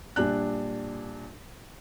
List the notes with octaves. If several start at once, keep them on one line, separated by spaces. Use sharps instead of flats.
A#1 G3 D4 F#6